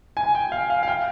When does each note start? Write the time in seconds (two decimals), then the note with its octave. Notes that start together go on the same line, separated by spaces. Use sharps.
0.17 G#5
0.35 G5
0.52 F5
0.70 F5
0.83 F5
0.88 G5